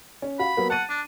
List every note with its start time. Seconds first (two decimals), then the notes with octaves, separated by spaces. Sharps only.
0.22 C#4
0.39 F#4 F5 B5
0.57 F#3 A#3 B3
0.70 F#5 A5 A6 D#7
0.90 D4